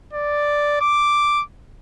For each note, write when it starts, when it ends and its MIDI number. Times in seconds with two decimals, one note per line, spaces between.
0.14 0.80 74
0.81 1.42 86